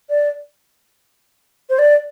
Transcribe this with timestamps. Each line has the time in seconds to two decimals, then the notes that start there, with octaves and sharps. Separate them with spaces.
0.10 D5
1.70 C5
1.79 D5